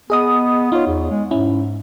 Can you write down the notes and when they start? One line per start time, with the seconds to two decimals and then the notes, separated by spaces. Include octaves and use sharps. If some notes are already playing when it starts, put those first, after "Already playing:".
0.10 B3 G#4 D#5 D#6
0.72 D#4 F4 C#5
0.87 E2
1.11 G#3
1.31 G#2 C#4 E4